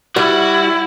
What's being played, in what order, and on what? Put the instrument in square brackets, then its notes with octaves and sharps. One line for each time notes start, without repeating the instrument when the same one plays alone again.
[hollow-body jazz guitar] G3 D5 [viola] E4 [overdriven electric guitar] F#4